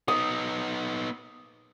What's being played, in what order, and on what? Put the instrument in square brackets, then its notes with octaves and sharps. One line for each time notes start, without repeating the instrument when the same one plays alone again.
[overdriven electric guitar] B3 D#4 [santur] D#6